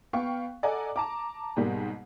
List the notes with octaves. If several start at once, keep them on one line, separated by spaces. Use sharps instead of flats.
B3 F5 G5 C#6
A4 D5 D#5 F#5 G#5 A#5
A5 A#5 D6
G#2 B2 G3 A#3